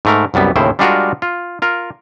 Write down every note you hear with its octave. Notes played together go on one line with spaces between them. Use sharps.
G#2 A3 A#4
C2 F#2 G3 B3
D#2 A2 C#3 E4 C5
G3 G#3 D4 F4 F#4 A#4
F4
F4 A#4